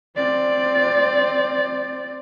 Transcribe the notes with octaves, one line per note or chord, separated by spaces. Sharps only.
C4 D5